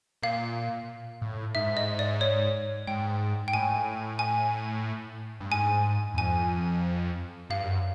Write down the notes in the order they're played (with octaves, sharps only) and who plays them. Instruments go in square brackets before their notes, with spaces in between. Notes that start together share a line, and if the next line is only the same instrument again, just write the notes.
[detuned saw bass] A#2 [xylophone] F5
[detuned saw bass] A2
[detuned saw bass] G#2 [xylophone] E5
[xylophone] D#5
D5
C#5
[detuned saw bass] G#2 [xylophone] G5
[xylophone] G5
[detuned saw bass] A2 [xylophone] G#5
[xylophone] G#5
[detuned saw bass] G2
[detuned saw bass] G#2 [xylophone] G#5
[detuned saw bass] E2
[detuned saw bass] F2 [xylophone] G#5
[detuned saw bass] G2 [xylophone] F5
[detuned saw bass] F#2